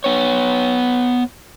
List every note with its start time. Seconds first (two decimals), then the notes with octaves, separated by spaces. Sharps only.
0.04 B3 C#5